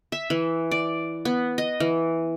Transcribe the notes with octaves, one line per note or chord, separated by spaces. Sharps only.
E5
E3
D5
B3
D#5
E3